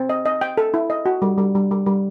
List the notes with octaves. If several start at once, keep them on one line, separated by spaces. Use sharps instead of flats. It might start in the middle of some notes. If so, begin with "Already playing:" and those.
Already playing: C4
D#5
D#5
G5
A4
E4
D#5
F#4
G3
G3
G3
G3
G3